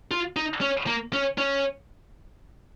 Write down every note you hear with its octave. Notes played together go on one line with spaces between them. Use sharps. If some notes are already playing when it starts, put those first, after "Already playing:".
F4
D#4
C#4
A#3
C#4
C#4